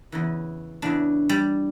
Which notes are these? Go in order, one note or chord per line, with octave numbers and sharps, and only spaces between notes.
E2 C#3 E3
E2 C#3 E3 D4
G3